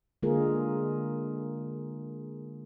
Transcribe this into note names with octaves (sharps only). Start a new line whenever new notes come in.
D3 G#3 A#3 F4 G#4 A#4